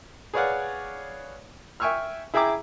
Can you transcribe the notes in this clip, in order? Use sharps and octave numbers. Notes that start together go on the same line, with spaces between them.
G#4 B4 C#5 D5 F5 F#5
E5 G5 G#5 C#6 E6 F6
E4 G#4 E5 G5 A#5 D6